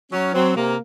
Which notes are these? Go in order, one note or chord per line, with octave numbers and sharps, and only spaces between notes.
F#3 C#4
F#3 C4
C3 A#3